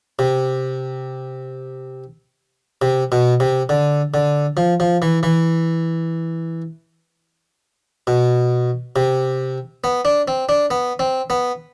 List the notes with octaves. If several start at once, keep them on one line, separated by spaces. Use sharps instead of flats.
C3
C3
B2
C3
D3
D3
F3
F3
E3
E3
B2
C3
B3
D4
C4
D4
B3
C4
B3